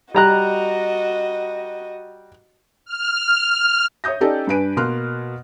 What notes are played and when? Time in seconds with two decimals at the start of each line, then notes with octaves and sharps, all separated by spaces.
0.14 G3 F#4 D#5 A#5 F#6
2.85 F6
4.04 C#5 E5 D#6 G6 A#6
4.20 C#4 D#4 G4 A4 D5 D#5
4.47 G2 D4 B4 G#5 D7 D#7
4.77 B2 A#3 C6 F6 F#6